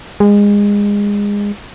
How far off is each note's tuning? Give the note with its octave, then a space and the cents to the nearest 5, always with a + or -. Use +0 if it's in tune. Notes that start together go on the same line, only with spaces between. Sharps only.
G#3 -25